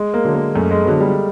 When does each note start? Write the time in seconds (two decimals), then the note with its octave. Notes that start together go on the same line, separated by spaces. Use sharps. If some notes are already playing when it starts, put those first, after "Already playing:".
Already playing: G#3
0.14 A#3
0.25 D3 F#3
0.34 A#3
0.55 F#2 A3
0.71 G#3
0.85 D3 F#3 G#3 B3
1.00 G3